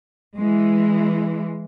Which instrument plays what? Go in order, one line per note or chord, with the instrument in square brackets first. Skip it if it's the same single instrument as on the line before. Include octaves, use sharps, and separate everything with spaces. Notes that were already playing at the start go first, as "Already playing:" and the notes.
[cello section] E3 G#3